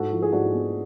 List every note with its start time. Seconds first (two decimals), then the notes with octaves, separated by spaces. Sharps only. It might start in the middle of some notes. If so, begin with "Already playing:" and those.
Already playing: G#2 F#4 A4
0.12 F3
0.22 G#4
0.33 G#2 D4 F#4
0.53 B3